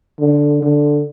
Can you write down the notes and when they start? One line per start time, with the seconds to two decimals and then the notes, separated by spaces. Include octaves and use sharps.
0.20 D3
0.62 D3